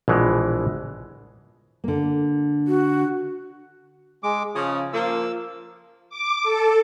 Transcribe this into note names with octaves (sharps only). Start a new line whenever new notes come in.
A#1 B2 E3 G#3
D3 A#3
F#4
G#3 D6
C#3 F3 D#6
F3 A#3 E6
D6
A4